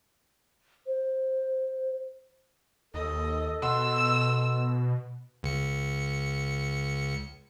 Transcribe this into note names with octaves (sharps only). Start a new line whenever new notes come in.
C5
D#2 A4 D#5
B2 D#5 F#5 C6 E6
C#2 C#7